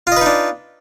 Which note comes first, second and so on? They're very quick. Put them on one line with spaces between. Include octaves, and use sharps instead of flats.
F4 D#5 B4 D#4 D4